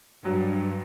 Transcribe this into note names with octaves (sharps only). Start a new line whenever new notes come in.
G2 F#3